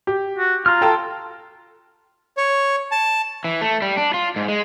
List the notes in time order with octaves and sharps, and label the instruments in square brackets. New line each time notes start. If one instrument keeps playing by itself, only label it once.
[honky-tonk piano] G4
[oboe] F#4
[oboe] F4 [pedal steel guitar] A#5 F6
[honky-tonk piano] A4 G5 A5
[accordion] C#5
A5
[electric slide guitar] E3
A3
G3
D4
F4
G#2
G#3